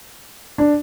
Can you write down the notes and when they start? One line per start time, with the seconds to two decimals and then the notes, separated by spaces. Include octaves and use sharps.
0.58 D4